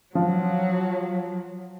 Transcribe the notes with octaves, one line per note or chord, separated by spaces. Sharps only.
F3 F#3